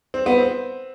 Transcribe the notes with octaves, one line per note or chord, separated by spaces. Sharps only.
C4
B3
C4